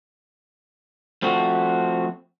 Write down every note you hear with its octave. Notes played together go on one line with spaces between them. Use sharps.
F3 A3 C4 F#4